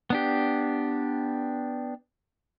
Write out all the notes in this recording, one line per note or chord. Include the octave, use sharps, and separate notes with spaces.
B3 D4 G4